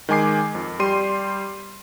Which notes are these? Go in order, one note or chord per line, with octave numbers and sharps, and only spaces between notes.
D#3 G#3 G#5 D6 C7
F2
G3 G4 C6 D#7